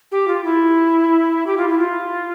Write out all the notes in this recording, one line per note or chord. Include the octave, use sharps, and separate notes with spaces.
G4
F4
E4
G4
F4
E4
F4